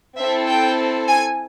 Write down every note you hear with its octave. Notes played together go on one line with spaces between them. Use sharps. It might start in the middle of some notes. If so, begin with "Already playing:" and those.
C4 E4 A4 E5
G5
G#5